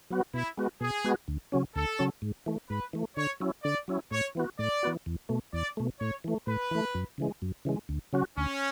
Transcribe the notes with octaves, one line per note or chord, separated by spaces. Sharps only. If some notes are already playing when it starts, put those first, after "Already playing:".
F#3 B3 F#4
B2 E4
G#3 B3 F#4
B2 G#4
G#3 B3 F#4
D2
C#3 F#3 C#4
D2 A4
C#3 F#3 C#4
G#2
E3 A3
G#2 B4
E3 A3
D3 C#5
F#3 C#4 E4
D3 D5
F#3 C#4 E4
A2 C#5
E3 B3 F#4
A2 D5
E3 B3 F#4
E2
B2 A3
E2 D5
B2 A3
A2 C#5
E3 A3
A2 B4
E3 A3
F#2
C#3 E3 G#3
F#2
C#3 E3 G#3
D2
C#3 F#3 C#4 F#4
D2 C#4